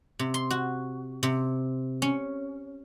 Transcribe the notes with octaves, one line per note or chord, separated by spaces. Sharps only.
C3
C6
F#4
C3
C#4